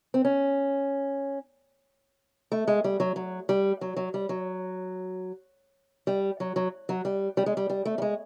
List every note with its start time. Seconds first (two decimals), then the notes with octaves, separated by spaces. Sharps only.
0.14 C4
0.25 C#4
2.52 A3
2.67 G#3
2.84 G3
3.00 F#3
3.16 F#3
3.49 G3
3.81 F#3
3.97 F#3
4.14 G3
4.29 F#3
6.07 G3
6.40 F#3
6.56 F#3
6.89 F#3
7.05 G3
7.37 G3
7.46 G#3
7.57 G3
7.70 G3
7.85 A3
7.98 G3
8.02 G#3